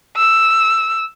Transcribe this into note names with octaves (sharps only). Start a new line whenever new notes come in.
E6